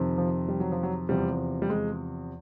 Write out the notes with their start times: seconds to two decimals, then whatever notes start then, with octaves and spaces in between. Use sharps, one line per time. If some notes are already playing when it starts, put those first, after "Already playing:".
Already playing: F2 C3 D#3
0.18 F3
0.48 G3
0.60 F#3
0.72 F3
0.83 F#3
1.09 E2 C3 F3 G3
1.62 G3
1.69 G#3